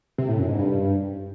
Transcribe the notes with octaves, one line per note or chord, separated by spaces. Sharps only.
C3
A2
F#2
G#2
G2